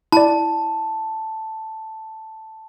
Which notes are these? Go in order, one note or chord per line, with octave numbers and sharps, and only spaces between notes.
E4 D5 A5